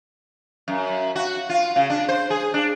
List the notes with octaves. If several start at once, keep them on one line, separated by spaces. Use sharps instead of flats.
F#2
F#4
F4
C#3
D4
C5
G#4
D4